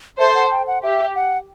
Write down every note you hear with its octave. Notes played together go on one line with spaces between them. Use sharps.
A4 C5 E5
F#5
G5
F#5
G4 E5
F#5